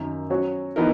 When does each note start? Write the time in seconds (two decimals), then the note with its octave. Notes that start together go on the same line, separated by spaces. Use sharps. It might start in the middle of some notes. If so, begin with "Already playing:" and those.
Already playing: F#2 D#3 A#3
0.30 F#3 C#4 F#4 C#5
0.76 E3 B3 D#4 A#4